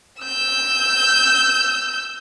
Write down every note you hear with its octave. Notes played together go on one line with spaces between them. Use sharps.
E6 G6